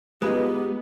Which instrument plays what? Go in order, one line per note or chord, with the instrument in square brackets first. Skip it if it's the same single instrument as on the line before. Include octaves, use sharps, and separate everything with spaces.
[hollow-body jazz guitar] G#3 [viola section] B3 [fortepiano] D#4 F4 B4 [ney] G4